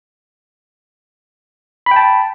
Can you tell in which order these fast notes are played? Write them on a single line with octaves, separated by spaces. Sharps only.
B5 G5 A5